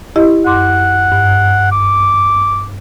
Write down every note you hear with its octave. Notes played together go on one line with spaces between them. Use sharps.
E4 G4 D#5
F#2 F#5 C6 D6
G2
D6